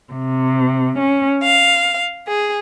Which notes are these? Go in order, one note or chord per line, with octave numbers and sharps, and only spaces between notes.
C3
C#4
F5
G#4